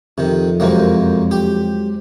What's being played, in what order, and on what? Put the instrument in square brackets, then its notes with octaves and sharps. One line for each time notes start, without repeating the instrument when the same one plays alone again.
[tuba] F2 [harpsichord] C3 D#3
[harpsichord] F#2 C3 A#3 [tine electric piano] F#3 G#3 C5
[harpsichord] G4